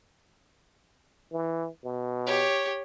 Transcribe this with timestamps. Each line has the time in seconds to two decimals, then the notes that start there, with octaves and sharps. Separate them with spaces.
1.32 E3
1.84 B2
2.26 G4 C#5